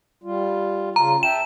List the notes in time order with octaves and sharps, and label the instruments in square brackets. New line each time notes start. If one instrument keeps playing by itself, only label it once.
[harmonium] G3 F4
[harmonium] C#3 F4 [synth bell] A#5
[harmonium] E5 G5 A5 [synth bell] E7